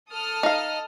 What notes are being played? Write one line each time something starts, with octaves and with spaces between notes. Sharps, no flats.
A4 D#6 F6
D#4 F5